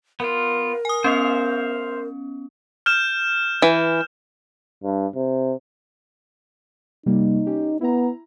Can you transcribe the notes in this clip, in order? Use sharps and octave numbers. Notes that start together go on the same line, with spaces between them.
B3 F4 A#4
G#5 D#6
B3 C#4 C5 E5 F5
F6 G6 E7
E3
G2
C3
C3 G3 A#3 D#4
C#4 G4
B3 E4 A#5